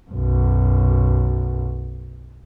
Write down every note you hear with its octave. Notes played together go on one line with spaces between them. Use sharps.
B1 F#2